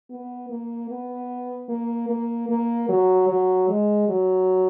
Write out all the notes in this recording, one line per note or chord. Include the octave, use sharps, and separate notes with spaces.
B3
A#3
B3
A#3
A#3
A#3
F#3
F#3
G#3
F#3